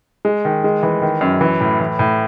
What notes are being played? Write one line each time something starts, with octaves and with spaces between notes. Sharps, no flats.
G#3
D#3
G#3
E3
D#3
F#2
E3
A2
E3
A2